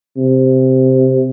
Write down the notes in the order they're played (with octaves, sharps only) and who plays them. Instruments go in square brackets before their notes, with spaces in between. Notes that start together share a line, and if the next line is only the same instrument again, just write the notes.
[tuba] C3